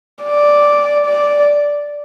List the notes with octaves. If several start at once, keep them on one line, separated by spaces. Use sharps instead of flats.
D5
D5